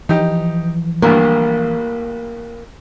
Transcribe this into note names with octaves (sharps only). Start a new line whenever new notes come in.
E3 F3 D#4 G4
A1 D2 G2 A#3